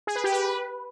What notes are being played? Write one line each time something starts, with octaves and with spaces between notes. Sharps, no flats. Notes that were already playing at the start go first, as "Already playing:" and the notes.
G#4
B4
G4
B4